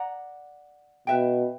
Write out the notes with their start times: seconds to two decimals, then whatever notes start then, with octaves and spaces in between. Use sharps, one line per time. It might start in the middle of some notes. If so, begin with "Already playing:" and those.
Already playing: D5 F#5 A#5
1.07 B2 B4 E5 G5